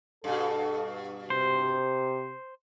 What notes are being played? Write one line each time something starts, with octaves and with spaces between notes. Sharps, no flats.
G2 B2 A4
C3 C5